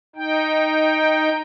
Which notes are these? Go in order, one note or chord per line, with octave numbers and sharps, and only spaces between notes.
D#4 G5